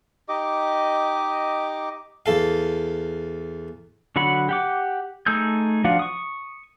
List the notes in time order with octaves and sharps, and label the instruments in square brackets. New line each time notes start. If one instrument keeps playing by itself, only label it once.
[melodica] D#4 G4 D#5 D6
[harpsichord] E2 A4 F5
[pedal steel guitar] D3 F#3 F#4 F#5 B5
G4 F#5 D6
A3 D#4 G#4 E6 G6
F3 D4 F#4 F5 F#5
C#6 D#6